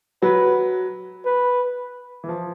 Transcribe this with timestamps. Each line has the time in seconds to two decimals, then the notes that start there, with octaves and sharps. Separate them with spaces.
0.22 F#3 B4
1.25 B4
2.24 E3
2.29 F3